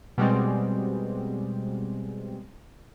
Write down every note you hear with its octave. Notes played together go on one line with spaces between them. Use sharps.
B2 G3 G#3 C4